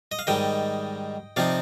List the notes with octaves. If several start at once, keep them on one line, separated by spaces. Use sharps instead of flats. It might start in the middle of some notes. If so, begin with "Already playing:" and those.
D#5
F5
G#2 D#3 G3 D#5 G5
C3 F3 C4 D#4 D5 F5